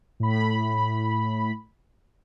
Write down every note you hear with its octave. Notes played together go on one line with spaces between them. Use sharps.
A2 B5